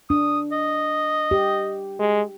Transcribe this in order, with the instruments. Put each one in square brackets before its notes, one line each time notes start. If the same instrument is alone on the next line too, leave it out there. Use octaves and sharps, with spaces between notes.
[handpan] D4 [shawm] D#6
[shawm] D#5
[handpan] G4
[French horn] G#3